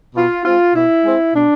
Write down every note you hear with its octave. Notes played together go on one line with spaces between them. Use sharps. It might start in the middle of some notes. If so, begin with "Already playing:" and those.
B2 F4
G#3 C4 F4
B2 E4
G#3 C4
B2 D4